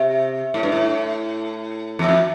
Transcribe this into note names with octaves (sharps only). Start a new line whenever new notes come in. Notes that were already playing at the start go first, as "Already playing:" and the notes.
Already playing: C3
A2
G2
A2
E2
F2